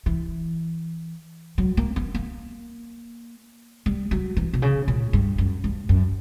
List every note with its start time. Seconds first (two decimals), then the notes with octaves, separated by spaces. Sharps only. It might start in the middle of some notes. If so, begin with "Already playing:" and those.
0.06 E3
1.58 F#3
1.77 A#3
1.96 B3
2.15 A#3
3.86 G3
4.11 F#3
4.37 E3
4.53 B2
4.62 C#3
4.88 A#2
5.13 G2
5.38 F#2
5.64 G2
5.89 F#2